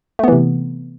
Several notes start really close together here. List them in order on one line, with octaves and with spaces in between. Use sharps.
A3 B3 E3 C3